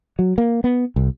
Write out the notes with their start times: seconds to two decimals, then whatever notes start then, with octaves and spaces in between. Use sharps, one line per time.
0.19 F#3
0.38 A#3
0.64 B3
0.96 C2